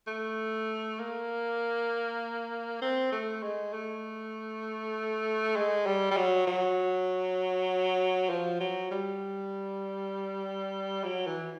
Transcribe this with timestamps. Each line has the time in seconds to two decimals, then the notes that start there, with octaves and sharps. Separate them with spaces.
0.07 A3
0.99 A#3
2.82 C4
3.12 A3
3.43 G#3
3.73 A3
5.56 G#3
5.86 G3
6.11 G3
6.17 F#3
6.47 F#3
8.30 F3
8.60 F#3
8.91 G3
11.04 F#3
11.27 E3